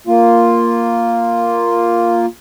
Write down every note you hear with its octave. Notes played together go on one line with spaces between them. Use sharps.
A#3 F4